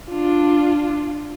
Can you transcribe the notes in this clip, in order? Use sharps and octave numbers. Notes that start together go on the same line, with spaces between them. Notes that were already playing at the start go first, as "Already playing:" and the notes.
D4 F4